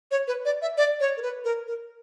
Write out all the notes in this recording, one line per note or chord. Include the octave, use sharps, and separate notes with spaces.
C#5
B4
D5
E5
D5
C#5
A#4
B4
A#4
A#4